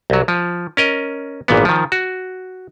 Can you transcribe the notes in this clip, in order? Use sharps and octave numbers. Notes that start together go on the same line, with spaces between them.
C2 F#3
F3
C#4 A#4 D#5
G#1 A#2 E3 B3
D#3 F3
F#4